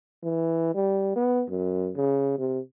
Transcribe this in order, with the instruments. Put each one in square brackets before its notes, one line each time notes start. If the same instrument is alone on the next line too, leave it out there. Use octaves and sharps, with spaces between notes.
[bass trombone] E3
G3
B3
F#2
C#3
C3